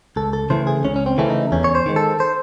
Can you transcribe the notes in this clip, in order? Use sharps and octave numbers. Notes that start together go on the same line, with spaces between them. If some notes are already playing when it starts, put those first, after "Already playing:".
C#2 A4
A4
C#3 E3 A3 C5
G#4
C#2 C#4
C#4
C4
C#3 E3 A3 C#4
D#4
E2 C#4
C#5
C5
D#3 G#3
A4
C5